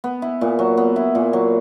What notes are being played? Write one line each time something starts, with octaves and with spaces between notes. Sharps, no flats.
B3
E4
A#2
F#3
B3
E4
A#2
F#3